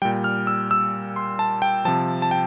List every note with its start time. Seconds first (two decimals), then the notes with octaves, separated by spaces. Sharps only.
0.02 G3 G5
0.05 A#2
0.24 F6
0.47 E6
0.71 E6
1.16 C6
1.39 A5
1.62 G5
1.85 C3 F3 A5
2.22 A5
2.31 G5